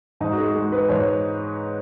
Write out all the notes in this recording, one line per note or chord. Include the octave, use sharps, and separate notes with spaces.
G#2 D#4
F#4
G#4
G#3
B4
G#2 C#5